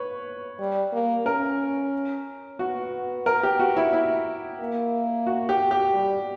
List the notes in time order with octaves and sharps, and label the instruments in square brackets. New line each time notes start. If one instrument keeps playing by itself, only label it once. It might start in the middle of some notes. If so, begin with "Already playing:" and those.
Already playing: [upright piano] B4 C#5
[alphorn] G3
A#3
[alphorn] C#4 [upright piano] A#4
[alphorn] B3 [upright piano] F#4
[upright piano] A#4
G4
F#4
E4
E4
[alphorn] A#3
[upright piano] F#4
G4
G4
[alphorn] G3